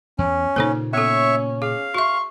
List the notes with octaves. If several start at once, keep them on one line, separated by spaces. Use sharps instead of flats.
E2 C#4
A#2 C#3 A#3 D#4 A4 C5
B3 C#4 A4 C#5 E5 C#6
G#4 F5
F#4 E5 C6 C#6